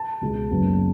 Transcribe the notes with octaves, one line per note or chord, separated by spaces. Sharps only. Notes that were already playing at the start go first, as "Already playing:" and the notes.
Already playing: A5
C#2 B2 G#3
F#1 F#2 C#3 F#3 B3